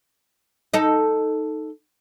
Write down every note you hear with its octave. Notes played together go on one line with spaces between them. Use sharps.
D#4 A4